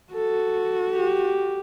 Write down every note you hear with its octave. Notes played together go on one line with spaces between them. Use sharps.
F#4 A4
G4